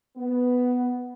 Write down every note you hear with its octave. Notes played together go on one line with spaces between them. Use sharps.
B3